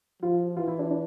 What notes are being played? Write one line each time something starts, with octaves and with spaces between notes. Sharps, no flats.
F3 F4
E3 F4
E4
D4
D4